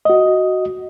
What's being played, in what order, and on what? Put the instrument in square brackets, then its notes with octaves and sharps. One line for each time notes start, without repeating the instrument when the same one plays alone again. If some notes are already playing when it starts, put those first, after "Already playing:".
[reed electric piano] F#4 D#5